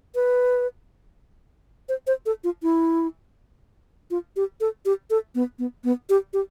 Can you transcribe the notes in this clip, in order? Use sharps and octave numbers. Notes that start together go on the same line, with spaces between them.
B4
C5
C5
A4
F4
E4
F4
G4
A4
G4
A4
B3
B3
B3
G4
G4